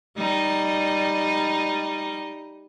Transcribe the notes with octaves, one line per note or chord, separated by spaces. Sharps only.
G3 D#4